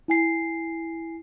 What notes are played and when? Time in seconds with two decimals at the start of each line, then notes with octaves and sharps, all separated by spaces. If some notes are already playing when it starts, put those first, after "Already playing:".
0.08 E4 G#5 C7